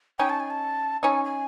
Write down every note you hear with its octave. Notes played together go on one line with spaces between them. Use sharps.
C#4 D#4 G5
A5
G#5
A5
C#4 D#4 G#5
G#5